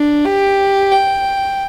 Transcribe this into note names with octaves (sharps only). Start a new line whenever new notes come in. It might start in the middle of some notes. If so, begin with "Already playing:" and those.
Already playing: D4
G4
G5